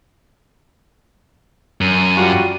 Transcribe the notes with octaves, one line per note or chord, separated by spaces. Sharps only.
F#2 D#7
G3 F4 F#4